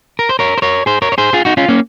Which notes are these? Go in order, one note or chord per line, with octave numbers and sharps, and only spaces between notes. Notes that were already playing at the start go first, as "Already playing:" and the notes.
A#4
C5
A#4 C#5
C5
A#4 C#5
G#4 C5
A#4 C#5
C#5
G#4 C5
F4 G#4
D#4 F#4
C#4 F4
A#3 C#4